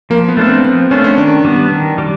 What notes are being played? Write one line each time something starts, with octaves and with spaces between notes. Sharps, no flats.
F3 A#3
B3
A3 D4 F4 A4
C4
F3 C4
A3 C#4 D4 F4 A4
C#4
D#3 D4
G3 B3
D#3
G3